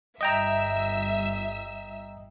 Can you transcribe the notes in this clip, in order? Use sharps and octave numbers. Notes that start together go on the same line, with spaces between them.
G1 D#5 E5 G5 A#5 E6